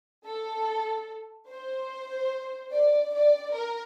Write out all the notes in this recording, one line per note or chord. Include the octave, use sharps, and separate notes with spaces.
A4
C5
D5
D5
A#4